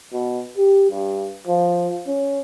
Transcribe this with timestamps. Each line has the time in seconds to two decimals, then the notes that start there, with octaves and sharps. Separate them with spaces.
0.13 B2
0.57 G4
0.90 G2
1.47 F3
2.07 C#4